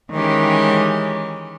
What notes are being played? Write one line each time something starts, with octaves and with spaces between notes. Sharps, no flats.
D#3 E3 G#3 C#4 G4